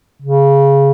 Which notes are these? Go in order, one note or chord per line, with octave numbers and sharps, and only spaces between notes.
C#3